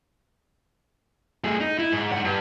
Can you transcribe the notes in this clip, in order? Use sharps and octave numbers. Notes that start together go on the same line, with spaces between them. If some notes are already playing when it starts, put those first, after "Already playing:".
A3 G#4
D#4
E4
G#2
D#4 F#5
G2